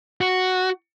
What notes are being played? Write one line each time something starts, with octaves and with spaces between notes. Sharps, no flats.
F#4